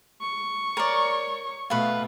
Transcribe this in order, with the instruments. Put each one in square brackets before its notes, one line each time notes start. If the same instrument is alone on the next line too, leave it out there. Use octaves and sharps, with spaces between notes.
[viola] C#6
[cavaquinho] A#4 D5 [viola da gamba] C#5
[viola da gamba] B2 A3 [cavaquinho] B4 F5